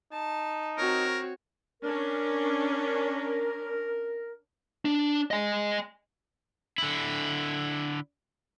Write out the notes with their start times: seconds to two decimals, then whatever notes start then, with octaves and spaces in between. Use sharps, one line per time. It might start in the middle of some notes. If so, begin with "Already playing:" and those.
0.12 D#4 A5
0.78 C4 F#4 A#4 C#5
1.82 C#4 D4 A#4
4.85 D4
5.31 D#5 G#5
6.78 D3 E4